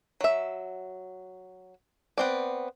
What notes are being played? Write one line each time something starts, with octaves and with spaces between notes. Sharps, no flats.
F#3 E5
B3 C4 D5